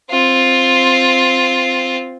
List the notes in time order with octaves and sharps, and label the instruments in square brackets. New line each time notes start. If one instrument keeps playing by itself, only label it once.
[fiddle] C4 F4